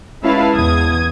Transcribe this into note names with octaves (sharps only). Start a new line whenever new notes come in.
G#3 C#4 E4 B4 F5 A5
E2 D#6 G#6